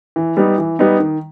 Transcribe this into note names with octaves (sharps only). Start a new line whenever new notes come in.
E3
G3 B3 D#4
E3
G3 B3 D#4
D#3